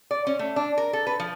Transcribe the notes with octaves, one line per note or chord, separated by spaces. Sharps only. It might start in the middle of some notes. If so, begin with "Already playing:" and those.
D5
C#4
A3
D4
A#4
A4
B4
F3